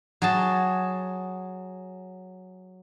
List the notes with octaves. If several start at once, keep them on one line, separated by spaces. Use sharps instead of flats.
F#3 G#4 A5